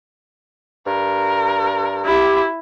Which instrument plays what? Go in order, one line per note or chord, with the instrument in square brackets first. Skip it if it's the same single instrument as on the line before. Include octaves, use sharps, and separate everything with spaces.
[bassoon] G2 [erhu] A#4
[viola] E4 [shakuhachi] G4